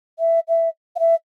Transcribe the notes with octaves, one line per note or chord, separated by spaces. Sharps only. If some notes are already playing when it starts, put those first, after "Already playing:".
E5
E5
F5
E5